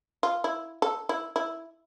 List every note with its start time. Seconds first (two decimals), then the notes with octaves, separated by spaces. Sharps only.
0.23 F4
0.44 E4
0.82 A4
1.09 E4
1.36 E4